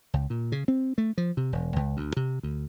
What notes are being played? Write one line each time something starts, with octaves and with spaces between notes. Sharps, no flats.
C#2
A#2
C#3
C4
A3
F3
C3
E1
C#2
D2
C3
D2